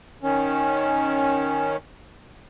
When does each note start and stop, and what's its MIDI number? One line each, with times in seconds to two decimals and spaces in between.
0.23 1.76 51
0.23 1.76 61